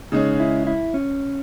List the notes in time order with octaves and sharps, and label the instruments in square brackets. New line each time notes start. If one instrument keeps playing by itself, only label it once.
[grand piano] C#3 G#3 C#4 [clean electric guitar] D#4
[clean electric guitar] E4
E4
C#4